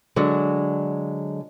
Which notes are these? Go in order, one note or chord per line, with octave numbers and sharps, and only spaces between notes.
D3 F#3 G#3